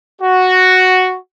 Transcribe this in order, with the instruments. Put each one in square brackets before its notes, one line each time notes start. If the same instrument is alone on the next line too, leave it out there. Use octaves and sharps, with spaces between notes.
[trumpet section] F#4